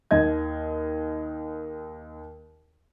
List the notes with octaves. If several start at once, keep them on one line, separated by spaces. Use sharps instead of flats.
D#2 D#5 G#6